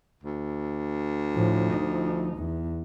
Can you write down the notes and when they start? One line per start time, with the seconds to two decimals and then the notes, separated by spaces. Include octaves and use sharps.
0.23 D2
1.34 A2 F3
1.73 F3 D#4
2.38 E2